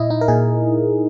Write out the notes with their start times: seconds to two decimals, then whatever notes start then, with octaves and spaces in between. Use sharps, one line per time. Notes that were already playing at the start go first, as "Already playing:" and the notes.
Already playing: A#2 E4 D#5
0.10 D#4
0.21 A#4
0.28 A#2 G#4